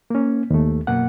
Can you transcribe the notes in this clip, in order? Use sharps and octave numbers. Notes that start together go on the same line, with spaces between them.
A#3 C#4
D#2 A3
F#2 B2 A#3 F#5